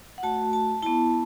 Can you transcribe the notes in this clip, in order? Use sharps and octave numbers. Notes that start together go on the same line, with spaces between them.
F#5
A3 F#4 A5
A5
B3 E4 A5